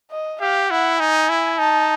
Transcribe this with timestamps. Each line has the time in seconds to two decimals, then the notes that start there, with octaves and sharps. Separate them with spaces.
0.11 D#5
0.41 G4 F5
0.70 E4 F#5
1.00 D#4 G#5
1.29 E4
1.59 D#4 A5